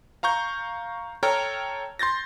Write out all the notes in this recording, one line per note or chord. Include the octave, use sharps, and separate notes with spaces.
F5 A#5 C#6 G6
A4 C#5 G5 A#5 F6
C6 G6 A6 A#6